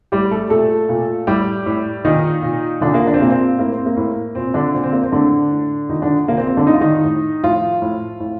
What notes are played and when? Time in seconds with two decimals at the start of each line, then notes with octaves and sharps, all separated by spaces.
0.12 A2 G3 G4
0.31 A3 A4
0.50 A#2 A3 A4
0.89 A#2
1.27 A2 G3 G4
1.66 A2
2.04 A#2 D#3 D#4
2.42 A#2
2.81 A#2 D3 D4
2.94 A#3
3.07 D4
3.14 C4
3.21 A#2 A#3
3.30 C4
3.59 A2 A#3
3.72 C4
3.86 A#3
3.97 A2
4.35 A#2 C4
4.54 D3 D4
4.73 A#2 C4
4.83 C4
4.92 A#3
5.03 C4
5.12 A2 D3 D4
5.51 A2
5.89 A#2 D#3 D#4
6.02 D3 D4
6.28 A#2 A#3
6.37 C4
6.47 C4
6.57 D3 D4
6.66 A2 D#4
6.73 F4
6.81 D#3 D#4
7.04 A2
7.43 A2 F3 F4
7.82 A2
8.20 A2